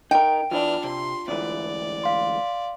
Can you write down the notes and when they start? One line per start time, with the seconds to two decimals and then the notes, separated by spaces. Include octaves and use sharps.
0.11 D#4 A#4 G5
0.51 E2 D4 F4 D5 F6
0.84 C3 C6
1.28 D2 G#2 E3 D5
2.04 F5 C6